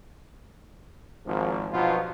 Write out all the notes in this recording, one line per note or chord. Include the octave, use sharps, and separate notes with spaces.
G#1 G#2 F3
G2 B2 F3 F#3 B3 F4